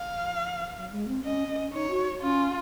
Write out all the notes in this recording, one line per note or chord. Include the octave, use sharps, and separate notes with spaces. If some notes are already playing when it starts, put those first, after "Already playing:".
Already playing: F5
F3
F3
F#3
G#3
C4
C#4 D#5
C#4
D#4 C#5
F#4
C#4 F4